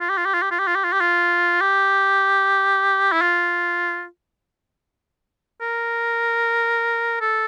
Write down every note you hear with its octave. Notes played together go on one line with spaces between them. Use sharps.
F4
G4
F4
G4
F4
G4
F4
G4
F4
G4
F4
G4
F4
G4
E4
F4
A#4
A4